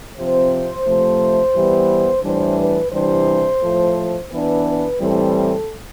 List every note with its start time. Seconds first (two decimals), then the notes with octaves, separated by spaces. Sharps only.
0.16 C3 F3 C4 C5
0.85 C3 F3 A3
1.54 E3 G3 B3
2.23 A2 E3 G3 D4 C5
2.58 B4
2.92 C3 E3 G3 D4 C5
3.61 A2 F3 A3
4.30 E3 B3 D4 B4
4.65 B4
5.00 A2 E3 G3 C4 A4